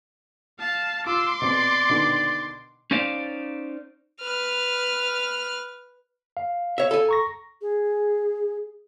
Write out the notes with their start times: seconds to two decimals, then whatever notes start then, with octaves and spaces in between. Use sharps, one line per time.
0.59 F5 A5
1.07 F4 C6 D6 E6
1.42 B2 C4 D5
1.89 B2 D3 D#3
2.91 C#4 D#4 C5 D5 F5
4.20 B4 F6
6.37 F5
6.78 C#5 E5
6.91 A4 G#5
7.09 A#5 C#6 A#6
7.62 G#4